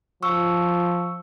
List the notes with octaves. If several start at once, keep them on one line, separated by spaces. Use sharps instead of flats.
F3 C#6 E6